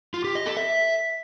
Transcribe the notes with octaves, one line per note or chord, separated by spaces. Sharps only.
F4
G4
D#5
A4
E5